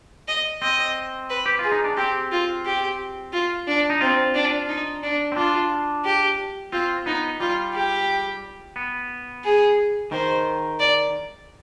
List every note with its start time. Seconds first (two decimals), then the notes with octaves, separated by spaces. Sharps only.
0.28 D#5
0.62 C4 D#5
1.30 B4
1.46 G4
1.59 F4 G#4
1.72 D#4
1.84 D4
1.97 C4 G4
2.32 F4
2.65 G4
3.33 F4
3.67 D4
3.90 D#4
4.01 C4 F4
4.35 D4
4.69 D#4
5.03 D4
5.32 C4
5.36 D4 F4
6.05 G4
6.72 C4 F4
7.06 B3 D#4
7.40 G3 F4
7.74 G4
8.76 B3
9.44 G#4
10.12 D#3 C5
10.80 D5